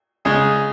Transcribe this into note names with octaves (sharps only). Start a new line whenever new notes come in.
C#3 G#3 G#4